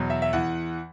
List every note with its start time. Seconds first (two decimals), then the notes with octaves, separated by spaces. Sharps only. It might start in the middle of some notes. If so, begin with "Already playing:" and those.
Already playing: E2 B2 F#3
0.10 E5
0.22 E5
0.33 E2 E3 F#5